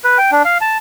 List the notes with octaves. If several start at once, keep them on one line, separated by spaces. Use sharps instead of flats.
B4
G5
D4
F5
A5